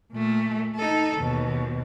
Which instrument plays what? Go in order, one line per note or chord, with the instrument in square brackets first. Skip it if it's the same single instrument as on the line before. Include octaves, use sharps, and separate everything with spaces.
[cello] A#2 A3
D#4 A4
D#2 B2